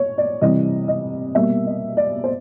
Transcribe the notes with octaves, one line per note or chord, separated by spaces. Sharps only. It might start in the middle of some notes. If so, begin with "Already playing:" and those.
Already playing: C#5
D5
C3 E3 G3 D#5
D#5
B2 G3 A#3 E5
D#5
D5
C5